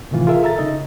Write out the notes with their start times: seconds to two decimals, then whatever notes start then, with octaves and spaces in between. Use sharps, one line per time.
0.11 A2 C3 D#3 E3 F4
0.27 F4 G#4 A#4 E5
0.42 A4 E5 A#5 A6
0.58 C#3 D#4 D#5